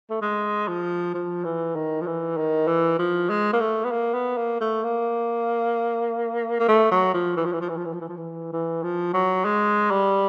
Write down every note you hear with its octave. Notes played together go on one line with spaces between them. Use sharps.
A3
G#3
F3
F3
E3
D#3
F3
E3
D#3
E3
F3
G#3
A#3
A3
B3
A#3
B3
A#3
A3
A#3
A#3
A3
F#3
F3
E3
F3
E3
F3
E3
F3
E3
F3
E3
F3
E3
E3
F3
F#3
G#3
G3